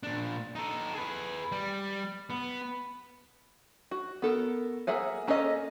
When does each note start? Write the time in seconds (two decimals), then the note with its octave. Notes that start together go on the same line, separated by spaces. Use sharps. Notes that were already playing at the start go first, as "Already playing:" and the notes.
0.03 A#2 D4
0.55 D#4 A4
0.95 G#4 B4
1.52 G3
2.30 B3
3.91 F#4
4.22 B3 A4 A#4
4.87 A#3 G#4 E5 F#5 G#5
5.27 A#3 C#4 G#4 A4 D#5